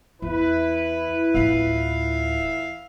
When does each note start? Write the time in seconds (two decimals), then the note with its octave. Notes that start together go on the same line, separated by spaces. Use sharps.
0.22 E2 E4 B4
1.34 D1 E3 F4 E5 F5